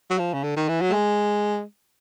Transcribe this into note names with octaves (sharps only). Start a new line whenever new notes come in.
F#3
F3
C#3
D3
D#3
E3
F#3
A3
G#3